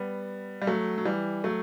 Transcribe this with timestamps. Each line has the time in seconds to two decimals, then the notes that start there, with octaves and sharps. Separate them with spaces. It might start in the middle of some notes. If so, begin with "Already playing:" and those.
Already playing: G3 B3
0.62 G3
0.67 F#3 A3
0.98 F#3
1.05 E3 G3
1.44 F#3 A3